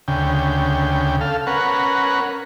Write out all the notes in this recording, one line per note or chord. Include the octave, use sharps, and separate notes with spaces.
D2 C#3 G5
A4 F5
C#4 A#4 B4 F#5